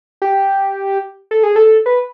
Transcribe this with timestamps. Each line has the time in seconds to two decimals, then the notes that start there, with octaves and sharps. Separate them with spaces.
0.22 G4
1.31 A4
1.43 G#4
1.56 A4
1.86 B4